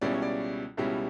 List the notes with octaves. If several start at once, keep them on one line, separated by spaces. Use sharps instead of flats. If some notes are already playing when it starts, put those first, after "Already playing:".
C#2 B2 G3 C#4 E4 D5
C#5
D5
C#2 B2 G3 C#4 E4